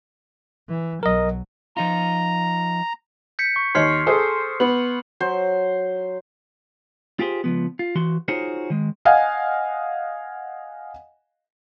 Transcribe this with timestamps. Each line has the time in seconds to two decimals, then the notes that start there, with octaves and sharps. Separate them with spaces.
0.69 E3
1.03 B1 F#3 A#4 D#5
1.77 F3 D#4 F4 A#5
3.39 G6 B6 C#7
3.56 C#6
3.75 D#2 C#5 C6 F6 C7
4.07 G#4 A4 C5
4.60 B3 F#7
5.20 F#3 C5
7.19 F4 G4 G#4 C5
7.44 C#2 F3 B3
7.79 F4
7.95 E3 F#4 C6
8.28 D#4 F4 F#4 G#4 C5 C#5
8.70 D#3 G#3
9.05 D#5 F5 F#5 G#5